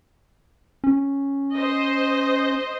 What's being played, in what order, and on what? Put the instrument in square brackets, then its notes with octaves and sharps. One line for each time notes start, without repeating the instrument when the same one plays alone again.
[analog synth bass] C#4
[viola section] C5 D#5